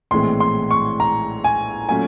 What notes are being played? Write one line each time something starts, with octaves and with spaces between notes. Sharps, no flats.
A#1 A2 E3 G#3 C4 C6
C6
C#6
A#5
G#5
A#2 F#3 A3 C#4 G#5